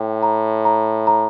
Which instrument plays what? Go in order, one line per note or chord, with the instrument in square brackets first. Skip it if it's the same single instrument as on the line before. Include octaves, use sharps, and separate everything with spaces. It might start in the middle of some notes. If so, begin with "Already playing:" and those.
Already playing: [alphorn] A2 [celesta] G5
[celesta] A#5
A#5
A#5